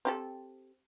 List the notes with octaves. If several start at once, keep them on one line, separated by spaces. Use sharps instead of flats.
C4 G4 A4